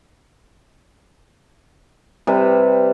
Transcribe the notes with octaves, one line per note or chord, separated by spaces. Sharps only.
C3 G3 B4